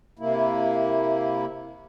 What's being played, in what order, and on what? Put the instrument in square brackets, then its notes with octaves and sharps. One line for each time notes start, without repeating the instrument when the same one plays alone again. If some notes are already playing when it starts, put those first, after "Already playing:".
[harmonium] C3 A#3 E4